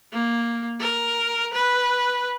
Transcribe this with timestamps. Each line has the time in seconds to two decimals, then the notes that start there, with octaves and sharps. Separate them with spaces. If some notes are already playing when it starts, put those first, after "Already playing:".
0.13 A#3
0.80 A#4
1.54 B4